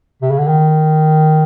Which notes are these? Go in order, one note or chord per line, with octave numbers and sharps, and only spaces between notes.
C3
C#3
D3
D#3